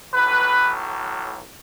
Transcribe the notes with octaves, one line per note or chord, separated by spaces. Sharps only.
B1 A2 F#3 B4